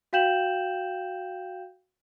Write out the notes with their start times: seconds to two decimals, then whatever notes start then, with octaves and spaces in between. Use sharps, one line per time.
0.13 F#4 F5 G5 G6 E7 F#7